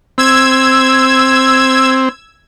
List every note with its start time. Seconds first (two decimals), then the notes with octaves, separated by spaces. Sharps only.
0.18 C4 E6 G#6